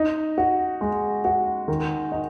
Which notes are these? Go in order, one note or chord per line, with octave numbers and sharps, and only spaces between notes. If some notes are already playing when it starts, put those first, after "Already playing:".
Already playing: D#4
F#4
G#3
F#4
D#3
D#4